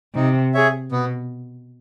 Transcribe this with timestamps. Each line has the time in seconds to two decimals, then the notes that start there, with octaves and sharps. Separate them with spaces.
0.15 C3 D#4
0.54 G#4 C#5 E5
0.92 B2 B3